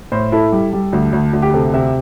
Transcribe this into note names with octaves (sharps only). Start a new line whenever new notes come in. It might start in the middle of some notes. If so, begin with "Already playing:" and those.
A2 C5
E4 A4
G3
G3
D2
D2
D2
G4
C3 A4
C3 E5